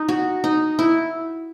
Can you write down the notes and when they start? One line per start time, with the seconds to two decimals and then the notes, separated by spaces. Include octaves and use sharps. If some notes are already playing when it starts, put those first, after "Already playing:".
Already playing: D#4
0.09 F#4
0.44 D#4
0.79 E4